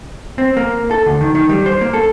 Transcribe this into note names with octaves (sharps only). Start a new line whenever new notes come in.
C4
A#3
A4
D2
D#3
D#3
G3
C5
A#3
A4